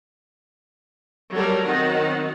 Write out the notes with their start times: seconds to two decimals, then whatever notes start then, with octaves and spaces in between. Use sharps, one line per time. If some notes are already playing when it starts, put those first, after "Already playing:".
1.32 F#3 G3 A3 A4 A#4 C#5
1.64 D#3 F#3 C4 D#4 F#5